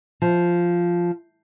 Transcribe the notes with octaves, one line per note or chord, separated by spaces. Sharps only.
F3